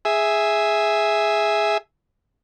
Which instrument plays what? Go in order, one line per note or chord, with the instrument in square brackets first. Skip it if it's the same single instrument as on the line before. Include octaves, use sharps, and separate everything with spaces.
[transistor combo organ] G#4 E5